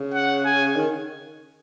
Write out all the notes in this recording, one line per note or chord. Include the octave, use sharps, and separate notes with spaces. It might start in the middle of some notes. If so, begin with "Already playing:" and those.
Already playing: C#3
F#5
G#5
D#3